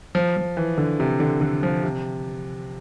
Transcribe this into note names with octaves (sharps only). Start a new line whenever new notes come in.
F3
F3
E3
D3
C3
D3
D3
F3
C3